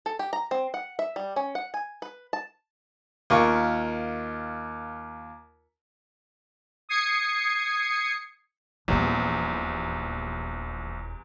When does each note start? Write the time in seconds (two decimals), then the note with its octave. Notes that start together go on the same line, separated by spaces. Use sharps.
0.06 A4
0.19 G4
0.33 A#5
0.51 C4
0.74 F#5
0.99 E5
1.16 G3
1.36 C#4
1.55 F#5
1.74 G#5
2.02 B4
2.33 A5
3.30 D#2 F4 A#4 C#6
6.89 D#6 G#6 C7 C#7
8.88 D#1 A#1 E2 G3 B3